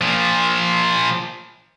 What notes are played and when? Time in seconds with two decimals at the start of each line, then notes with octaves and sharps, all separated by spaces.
0.01 A#2 F3